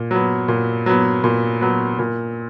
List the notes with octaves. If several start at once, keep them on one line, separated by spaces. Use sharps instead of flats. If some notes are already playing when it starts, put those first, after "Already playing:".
Already playing: A#2
F#3 B3
A#2
F#3 B3
A#2
F#3 B3
A#2